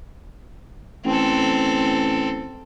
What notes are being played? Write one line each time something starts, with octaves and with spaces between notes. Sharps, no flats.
A1 C4 A4